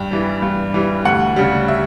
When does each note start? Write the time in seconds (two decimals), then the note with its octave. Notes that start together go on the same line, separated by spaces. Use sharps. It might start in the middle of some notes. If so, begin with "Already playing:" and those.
Already playing: G2 G5
0.11 E3 G3
0.42 G2
0.74 E3 G3
1.05 D2 F#5
1.36 C#3 G3
1.68 E5